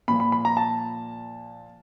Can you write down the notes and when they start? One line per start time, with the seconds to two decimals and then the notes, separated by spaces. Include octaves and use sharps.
0.08 A#2 F3 B5
0.20 B5
0.32 B5
0.45 A#5
0.57 A5